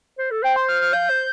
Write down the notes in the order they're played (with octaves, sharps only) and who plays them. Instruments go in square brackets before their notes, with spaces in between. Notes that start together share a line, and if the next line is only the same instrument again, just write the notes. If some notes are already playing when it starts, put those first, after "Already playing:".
[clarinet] C5
A4
[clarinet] C5 [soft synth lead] G5
[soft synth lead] C6
F6
F6
[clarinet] F5 [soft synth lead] G6
[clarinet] C5